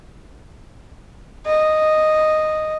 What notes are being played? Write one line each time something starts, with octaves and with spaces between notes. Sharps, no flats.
D#5